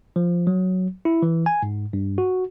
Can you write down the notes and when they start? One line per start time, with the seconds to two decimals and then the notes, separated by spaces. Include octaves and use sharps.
0.16 F3
0.47 F#3
1.05 E4
1.22 E3
1.46 G#5
1.63 G#2
1.93 G2
2.18 F#4